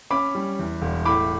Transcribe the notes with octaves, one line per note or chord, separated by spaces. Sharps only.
C#4 B5 D6
G3
E2
E1
A2 B5 D6